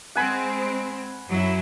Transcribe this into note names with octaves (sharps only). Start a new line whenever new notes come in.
G#3 C4 F#5 G#5 B5
F#2 F#3 E4